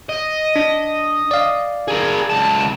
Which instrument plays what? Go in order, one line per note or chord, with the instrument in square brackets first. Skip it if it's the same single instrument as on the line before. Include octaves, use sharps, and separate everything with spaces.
[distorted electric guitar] D#5
[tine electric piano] D4
D5 F5
[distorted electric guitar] G#4 A#4
C#2 A5